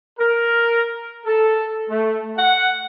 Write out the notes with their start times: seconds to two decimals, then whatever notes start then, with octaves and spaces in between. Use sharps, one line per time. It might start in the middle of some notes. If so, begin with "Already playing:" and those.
0.19 A#4
1.26 A4
1.90 A3
2.38 F#5